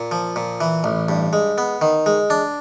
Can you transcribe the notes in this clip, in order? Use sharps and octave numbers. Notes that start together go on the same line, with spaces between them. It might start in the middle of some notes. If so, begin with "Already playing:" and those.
Already playing: A#2
F3
A#2
E3
A1
G2
G#3
B3
D#3
G#3
D4